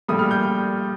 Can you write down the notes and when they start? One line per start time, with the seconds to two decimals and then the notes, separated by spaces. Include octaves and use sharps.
0.08 A#1 A2 G3 D#6
0.19 F6
0.31 G6